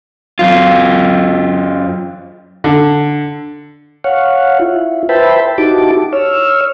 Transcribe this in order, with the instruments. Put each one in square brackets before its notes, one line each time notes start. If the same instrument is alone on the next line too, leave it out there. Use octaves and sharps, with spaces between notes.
[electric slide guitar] F#2 F4
[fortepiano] D3
[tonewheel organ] C#5 F5 F#5
E4 F4
B4 C5 E5 G5 A5 B5
D#4 E4 F#4 G4 A5 D6
C#5 E6 F6